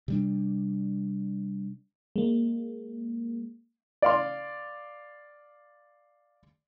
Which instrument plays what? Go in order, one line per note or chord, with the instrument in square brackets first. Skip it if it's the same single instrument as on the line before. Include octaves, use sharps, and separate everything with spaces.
[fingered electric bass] C3 G3 D4
[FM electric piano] G#3 A#3
[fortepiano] D5 F5 C6